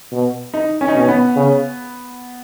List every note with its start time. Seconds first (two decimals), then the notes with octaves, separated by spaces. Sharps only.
0.12 B2
0.54 D#4
0.81 C#4
0.88 D#4
0.95 B2 C#4
1.08 B3
1.36 C#3